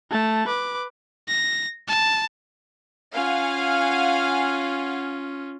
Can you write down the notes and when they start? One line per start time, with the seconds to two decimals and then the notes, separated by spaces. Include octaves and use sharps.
0.10 A3 A5
0.47 B4 D6
1.28 A#6
1.88 A5
3.14 C#4 F4 F5 F#5 G#5